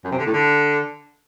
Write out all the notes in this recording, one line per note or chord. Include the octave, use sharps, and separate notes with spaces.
F#2
C3
D3
A2
D3